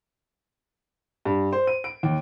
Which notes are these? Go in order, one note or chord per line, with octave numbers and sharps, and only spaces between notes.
G2
C5
D#7
D7
D#2